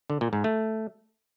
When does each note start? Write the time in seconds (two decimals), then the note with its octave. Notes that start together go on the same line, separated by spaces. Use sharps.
0.10 D3
0.21 A#2
0.33 G#2
0.44 A3